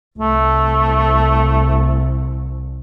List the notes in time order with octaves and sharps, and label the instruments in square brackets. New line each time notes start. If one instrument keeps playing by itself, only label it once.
[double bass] C2 [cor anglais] A3